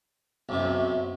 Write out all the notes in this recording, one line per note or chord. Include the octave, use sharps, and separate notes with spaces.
B1 F#2 C3